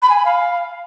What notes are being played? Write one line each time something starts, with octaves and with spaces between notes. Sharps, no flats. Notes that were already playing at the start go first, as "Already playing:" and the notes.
B5
G#5
B5
F5